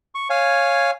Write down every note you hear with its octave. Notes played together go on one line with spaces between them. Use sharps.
C#6
C#5 F5 G#5